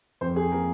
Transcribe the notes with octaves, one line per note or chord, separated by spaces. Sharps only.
F2 C5
G#4
F3 A#3 A#4